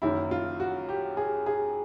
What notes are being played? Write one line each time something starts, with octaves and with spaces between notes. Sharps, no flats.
F#1 F#2 D#3 E4
F4
F#4
G4
G#4
G#4